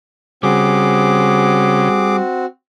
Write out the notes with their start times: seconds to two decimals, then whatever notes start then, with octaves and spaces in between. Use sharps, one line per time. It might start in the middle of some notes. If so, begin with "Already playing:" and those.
0.43 C#3 G3 C4 F#4 G#4 D6